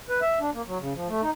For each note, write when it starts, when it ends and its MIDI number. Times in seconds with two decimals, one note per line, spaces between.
0.09 0.20 71
0.22 0.39 76
0.41 0.50 62
0.54 0.62 58
0.68 0.78 54
0.80 0.93 49
0.95 1.08 53
1.08 1.21 57
1.22 1.31 63